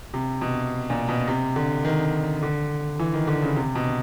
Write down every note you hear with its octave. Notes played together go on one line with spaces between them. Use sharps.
C3
B2
A#2
B2
C3
D3
D#3
D3
E3
D#3
D3
C#3
C3
B2